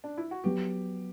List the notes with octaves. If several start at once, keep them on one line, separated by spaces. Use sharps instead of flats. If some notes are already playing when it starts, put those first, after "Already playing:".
D4
E4
F#4
F#3 B3 G4